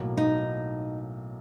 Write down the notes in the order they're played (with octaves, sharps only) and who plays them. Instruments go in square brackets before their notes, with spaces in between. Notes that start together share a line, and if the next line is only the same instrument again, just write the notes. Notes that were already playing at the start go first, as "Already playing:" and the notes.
Already playing: [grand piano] B1 A2 F#3 A#3
[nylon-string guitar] D#4